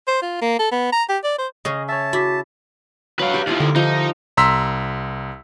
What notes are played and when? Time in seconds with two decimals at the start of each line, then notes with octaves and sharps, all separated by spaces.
0.07 C5
0.22 F4
0.42 A#3
0.59 A4
0.72 B3
0.92 A#5
1.09 G4
1.24 D5
1.39 C5
1.65 C#3 C#4 G#4 D#5
1.89 C#5 E5 A5
2.13 E4 F#4 D6 B6
3.19 F#3 B4 F5
3.34 G4
3.47 D#2 F3 E4 F4 F5
3.60 D3 A#4
3.76 F3 D#4
4.37 C2 A#5 C6 E6 B6